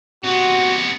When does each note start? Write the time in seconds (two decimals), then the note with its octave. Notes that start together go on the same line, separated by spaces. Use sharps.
0.24 C3 B3 F#4